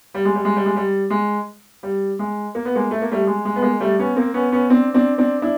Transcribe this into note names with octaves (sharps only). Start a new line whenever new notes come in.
G3
G#3
G3
G#3
G3
G#3
G3
G#3
G3
G#3
A#3
B3
G#3 A#3
A3
A#3
G3 A3
G#3
G#3
B3
G#3 A#3
G3 A3
B3 C#4
A#3 C4
B3 C#4
B3 C#4
C4 D4
C4 D4
C4 D4
D4 E4